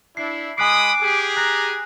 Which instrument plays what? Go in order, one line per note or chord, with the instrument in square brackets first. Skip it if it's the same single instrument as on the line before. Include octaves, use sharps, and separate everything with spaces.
[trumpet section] D4 E4 [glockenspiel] C7
[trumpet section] G#3 B5 D#6 [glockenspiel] G#5 F#6 C7 [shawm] D6
[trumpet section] G4 G#4
[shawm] A#5 [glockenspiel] F#6